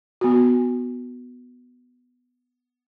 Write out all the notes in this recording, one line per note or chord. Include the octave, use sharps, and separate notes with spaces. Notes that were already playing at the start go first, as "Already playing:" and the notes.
B3 F#4